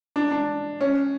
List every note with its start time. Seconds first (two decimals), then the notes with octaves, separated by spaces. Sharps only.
0.16 D4
0.32 D4
0.81 C#4